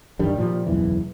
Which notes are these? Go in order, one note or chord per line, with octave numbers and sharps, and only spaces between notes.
G2 D#3 G3
A#2 F3 G3
F#1 B1 E2 E3